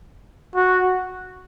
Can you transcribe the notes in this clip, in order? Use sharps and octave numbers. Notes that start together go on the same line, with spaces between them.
F#4